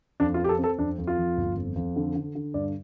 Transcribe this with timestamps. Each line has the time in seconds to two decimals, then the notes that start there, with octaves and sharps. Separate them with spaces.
0.20 F2 D4
0.34 F4
0.39 C4
0.44 G4
0.49 A4
0.59 C4
0.64 A4
0.78 F2 D4
0.98 F2
1.07 F4
1.17 F3
1.37 G1
1.57 F2
1.76 F2
1.96 D3
2.15 D3
2.35 D3
2.54 G2 D5